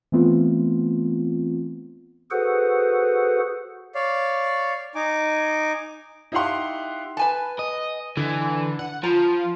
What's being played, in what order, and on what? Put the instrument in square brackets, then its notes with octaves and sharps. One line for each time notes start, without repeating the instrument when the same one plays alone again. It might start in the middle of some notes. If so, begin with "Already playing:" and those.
[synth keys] E3 A3 B3 C4 F4
[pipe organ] F#4 G#4 A4 B4 C5 F#5
[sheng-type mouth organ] C#5 D5 F5
D#4 G#5 D6
[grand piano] D#4 E4 G4 F5 F#5 C6
[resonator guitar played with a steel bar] B4 G#5 A5
[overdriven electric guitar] D#5
[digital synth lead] D3 [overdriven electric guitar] E3
[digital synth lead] F#5
[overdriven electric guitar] F3 [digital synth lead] F4 [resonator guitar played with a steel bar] A#5